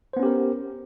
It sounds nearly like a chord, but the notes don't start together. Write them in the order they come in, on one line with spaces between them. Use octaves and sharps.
C5 B3 C#4 G4 A#4